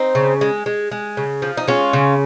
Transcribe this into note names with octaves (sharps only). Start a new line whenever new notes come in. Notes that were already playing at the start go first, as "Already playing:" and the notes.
Already playing: C4 D#4
C#3
G#3
G#3
G#3
C#3
F3
D#4
G#3 C#4 F4
C#3